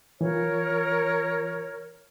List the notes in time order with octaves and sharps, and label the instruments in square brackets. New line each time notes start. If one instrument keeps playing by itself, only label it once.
[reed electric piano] E3 F4 [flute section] A#4 C#5